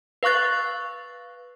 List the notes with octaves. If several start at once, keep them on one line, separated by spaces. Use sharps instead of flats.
B4 F5 C#6 F#6 A6